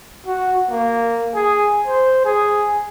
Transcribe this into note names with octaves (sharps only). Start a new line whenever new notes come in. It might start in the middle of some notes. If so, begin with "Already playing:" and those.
F#4
A#3
G#4
C5
G#4